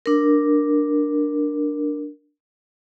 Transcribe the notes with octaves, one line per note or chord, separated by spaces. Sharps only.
D4 A#4